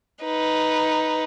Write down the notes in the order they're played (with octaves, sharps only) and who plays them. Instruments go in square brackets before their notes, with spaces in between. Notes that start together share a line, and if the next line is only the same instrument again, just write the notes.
[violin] D#4 B4